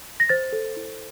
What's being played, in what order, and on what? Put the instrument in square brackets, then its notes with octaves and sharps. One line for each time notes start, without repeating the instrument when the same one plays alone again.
[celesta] A#6
C5 A6
A4
E4